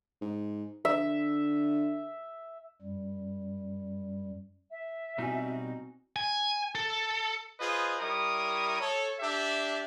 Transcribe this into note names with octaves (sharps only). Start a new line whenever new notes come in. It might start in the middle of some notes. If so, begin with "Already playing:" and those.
G#2
D3 E5
F#2 G3
E5
B2 G3 C4 D#4 E4 F#4 G#5
G#5
A4
F4 G#4 B4 C5 D#5
G3 E4 A#4 C#5 D#6
A4 C#5
D4 G4 E5